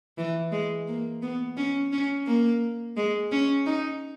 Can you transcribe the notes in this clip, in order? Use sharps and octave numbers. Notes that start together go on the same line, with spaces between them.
E3
G#3
A#3
B3
C#4
C#4
A#3
G#3
C#4
D#4